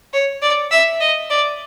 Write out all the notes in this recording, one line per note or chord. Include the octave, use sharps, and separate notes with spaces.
C#5
D5
E5
D#5
D5